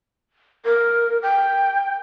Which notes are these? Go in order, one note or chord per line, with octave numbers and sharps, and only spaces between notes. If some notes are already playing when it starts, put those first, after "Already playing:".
A#4
G5